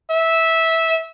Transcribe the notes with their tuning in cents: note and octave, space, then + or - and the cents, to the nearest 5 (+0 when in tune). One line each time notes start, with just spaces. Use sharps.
E5 -15